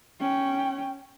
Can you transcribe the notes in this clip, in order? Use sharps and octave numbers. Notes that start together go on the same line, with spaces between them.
C#4 G5